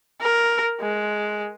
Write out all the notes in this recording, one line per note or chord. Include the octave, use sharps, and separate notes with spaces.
A#4
G#3